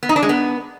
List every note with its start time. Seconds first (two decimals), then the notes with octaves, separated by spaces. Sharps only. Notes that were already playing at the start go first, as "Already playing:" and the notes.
0.03 B3
0.09 D#4
0.16 D4
0.22 G#3
0.29 B3